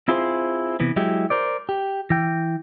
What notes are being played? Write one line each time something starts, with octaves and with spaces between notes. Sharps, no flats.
C4 E4 F4 G#4 B4 C5
C3 E3 B3
F#3 G#3 E4 G4
A#4 C5 D5
G4
E3 G5